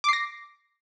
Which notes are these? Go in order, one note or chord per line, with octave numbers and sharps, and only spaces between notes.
D6 A#6 C7